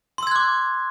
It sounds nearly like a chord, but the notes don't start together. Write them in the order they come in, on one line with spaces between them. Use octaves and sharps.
C6 E6 G#6 F#6 D6